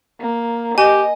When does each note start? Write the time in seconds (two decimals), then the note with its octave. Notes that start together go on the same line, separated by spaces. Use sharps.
0.21 A#3
0.78 G4 D#5 G#5